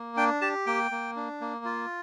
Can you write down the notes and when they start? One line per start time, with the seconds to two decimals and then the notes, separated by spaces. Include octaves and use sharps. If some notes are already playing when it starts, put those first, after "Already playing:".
Already playing: A#3
0.17 D4 G5
0.41 G4 A5
0.66 A#3 G5
0.91 A#3
1.16 D4
1.41 A#3
1.65 F4